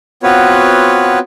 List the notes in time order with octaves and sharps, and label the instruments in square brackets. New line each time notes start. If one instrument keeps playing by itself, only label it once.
[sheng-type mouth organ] B3 C4 F4 F#4 B4 C#5